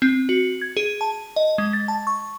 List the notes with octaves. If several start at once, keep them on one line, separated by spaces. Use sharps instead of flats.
C4
F#4
G#6
G#4
A5
D#5
G#3
A6
A5
C#6